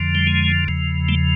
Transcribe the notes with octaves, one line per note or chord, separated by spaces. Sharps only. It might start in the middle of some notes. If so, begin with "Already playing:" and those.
Already playing: F2 D3 F3
G3
G#3
E2 C#3 F3
G3 A3